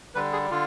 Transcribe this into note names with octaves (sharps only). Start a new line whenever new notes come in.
D3 G3 B4
G#4
D3 F4